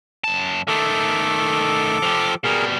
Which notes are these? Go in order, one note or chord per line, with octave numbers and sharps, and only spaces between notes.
F#2 A5
D#3 A3 A4 D6
F3 G4
B2 G3 G#4 A#4